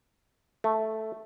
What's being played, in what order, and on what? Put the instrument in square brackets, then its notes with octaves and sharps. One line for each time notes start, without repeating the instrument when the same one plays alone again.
[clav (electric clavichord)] A3